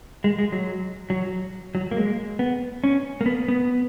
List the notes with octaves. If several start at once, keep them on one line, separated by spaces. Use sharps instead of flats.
G#3
G#3
F#3
F#3
F#3
A#3
G#3
B3
C#4
A#3
B3
B3